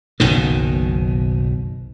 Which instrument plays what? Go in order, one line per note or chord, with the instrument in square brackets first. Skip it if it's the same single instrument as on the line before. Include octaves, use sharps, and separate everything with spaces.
[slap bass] F#1 B1 B2 D#3